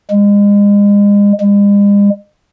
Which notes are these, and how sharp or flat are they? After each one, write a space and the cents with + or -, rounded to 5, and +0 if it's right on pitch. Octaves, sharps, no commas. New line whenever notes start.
G#3 -35
G#3 -45